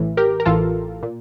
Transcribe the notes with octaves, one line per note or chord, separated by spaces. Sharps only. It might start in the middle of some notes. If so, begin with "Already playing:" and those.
Already playing: A1 A2 E3
G4 A#4
A#4
A1 A2 E3 F4 A4
A#2